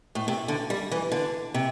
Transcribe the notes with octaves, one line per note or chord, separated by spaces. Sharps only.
A2
C3
D3
G3
E3
D3
C3